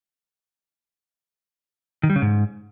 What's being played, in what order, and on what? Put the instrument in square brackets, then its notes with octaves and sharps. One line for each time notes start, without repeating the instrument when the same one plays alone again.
[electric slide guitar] D#3
G3
C#3
G#2